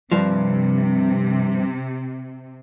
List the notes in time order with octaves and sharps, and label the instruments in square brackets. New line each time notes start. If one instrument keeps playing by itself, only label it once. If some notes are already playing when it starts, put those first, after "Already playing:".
[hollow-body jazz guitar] G2 F3 [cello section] C3